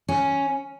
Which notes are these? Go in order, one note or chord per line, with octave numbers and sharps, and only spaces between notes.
C#4